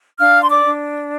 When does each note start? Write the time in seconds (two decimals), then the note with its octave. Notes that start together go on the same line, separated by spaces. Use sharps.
0.19 D4 F5 F6
0.42 C6
0.49 D5 D6
0.65 D4